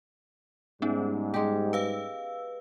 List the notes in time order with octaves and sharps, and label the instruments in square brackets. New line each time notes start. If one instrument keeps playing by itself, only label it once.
[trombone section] G#2 G3 [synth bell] B3 C#4 D#4
[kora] G#3 G4
[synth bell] B4 F5 E6